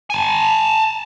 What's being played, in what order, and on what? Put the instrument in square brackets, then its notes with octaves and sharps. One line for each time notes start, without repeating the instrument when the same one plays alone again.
[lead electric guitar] G#5 A5